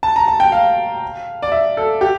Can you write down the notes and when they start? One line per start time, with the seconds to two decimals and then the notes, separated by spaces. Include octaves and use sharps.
0.03 A5
0.16 A#5
0.28 A5
0.40 G5
0.52 F5
1.42 D5
1.52 E5
1.77 A4
2.01 G4